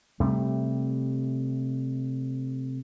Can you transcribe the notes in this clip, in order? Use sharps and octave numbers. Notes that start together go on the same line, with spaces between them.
C3 G3 A3